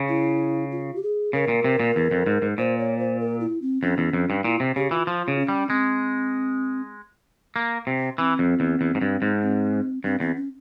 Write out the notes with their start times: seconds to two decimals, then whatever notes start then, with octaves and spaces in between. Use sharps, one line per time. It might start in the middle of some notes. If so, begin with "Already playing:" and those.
Already playing: C#3
0.09 E4
0.72 F4
0.96 G4
1.03 G#4
1.33 C#3 A#4
1.48 A#2
1.64 C3
1.80 A#2
1.96 E2
2.11 F2
2.26 G#2
2.42 G#2
2.58 A#2 C5
2.79 C#5
2.99 C5
3.20 A#4
3.40 E4
3.62 C4
3.82 F2 C#4
3.98 E2
4.13 F2
4.30 G2
4.44 A#2 E4
4.60 C3
4.76 C#3 G4
4.91 E3 F4
5.07 F3 F4
5.28 C#3
5.38 C#4
5.48 G3
5.69 G#3 C4
7.56 A#3
7.87 C3
8.18 E3 C4
8.39 F2
8.60 E2
8.81 E2
8.95 G#2
9.01 G2
9.22 G#2
9.43 C4
10.04 G2 C4
10.20 E2 C4
10.36 C#4